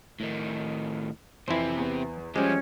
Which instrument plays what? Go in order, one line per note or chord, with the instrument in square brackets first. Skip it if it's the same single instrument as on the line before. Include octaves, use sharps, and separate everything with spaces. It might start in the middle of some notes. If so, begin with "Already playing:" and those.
[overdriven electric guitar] A2 D#3
[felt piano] F2 E3 [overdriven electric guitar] C3 C4 [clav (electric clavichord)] E4 C5
[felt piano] E2 B3
[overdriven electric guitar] F3 G4 [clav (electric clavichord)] G3 G#3 [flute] C#4 [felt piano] C5 G#5